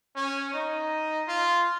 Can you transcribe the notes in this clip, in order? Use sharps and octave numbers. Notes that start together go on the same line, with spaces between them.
C#4
D#4
F4